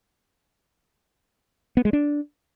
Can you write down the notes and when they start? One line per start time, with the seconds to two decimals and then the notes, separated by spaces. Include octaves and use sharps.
1.77 B3
1.85 G#3
1.93 D4